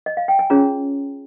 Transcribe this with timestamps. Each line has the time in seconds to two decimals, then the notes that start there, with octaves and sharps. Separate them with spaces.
0.06 D#5
0.17 F5
0.28 G5
0.39 G#5
0.50 C#4 F4 G#4 C#5 A#5